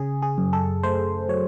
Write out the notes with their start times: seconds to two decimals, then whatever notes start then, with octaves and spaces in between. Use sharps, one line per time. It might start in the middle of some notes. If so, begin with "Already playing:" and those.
Already playing: C#3 G#4
0.22 G#4
0.38 F#2
0.53 A4
0.83 A3 C5
1.29 F#3 C#5